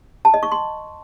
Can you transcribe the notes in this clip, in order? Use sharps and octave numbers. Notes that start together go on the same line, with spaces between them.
A5
D#5
C#6
C6